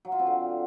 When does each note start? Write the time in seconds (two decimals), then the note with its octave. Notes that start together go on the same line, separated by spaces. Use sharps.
0.05 F#3
0.12 F4
0.19 C4
0.27 D3